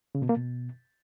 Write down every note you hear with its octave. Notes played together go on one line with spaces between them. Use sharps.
C#3
B2
A#3
B2